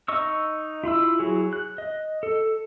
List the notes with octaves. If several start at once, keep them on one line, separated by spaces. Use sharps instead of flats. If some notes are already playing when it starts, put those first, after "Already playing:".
D#4 D#5 C#6 E6
E4 F4 B5 E6
F#3 E4 F#4 G#4
F#6
D#5
A4